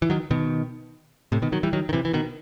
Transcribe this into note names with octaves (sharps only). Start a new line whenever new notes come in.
E3
D#3 F#3
B2 D#3
A2 C3
B2 D#3
D#3 F#3
E3 G3
D#3 F#3
D#3
C3 E3
E3
B2 D#3